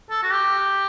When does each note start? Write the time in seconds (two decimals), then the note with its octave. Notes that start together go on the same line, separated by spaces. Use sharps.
0.10 A4
0.23 F#4
0.32 G4